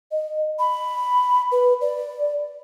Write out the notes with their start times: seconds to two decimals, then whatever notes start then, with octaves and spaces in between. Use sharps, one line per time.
0.11 D#5
0.59 B5
1.52 B4
1.81 D5